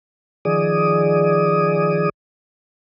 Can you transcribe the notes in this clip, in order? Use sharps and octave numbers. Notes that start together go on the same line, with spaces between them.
D#3 F3 G#4 D5 D#6